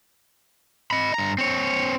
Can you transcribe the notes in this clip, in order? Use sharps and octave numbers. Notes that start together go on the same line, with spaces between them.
D#5 B5
G2 A#5
C4 C#5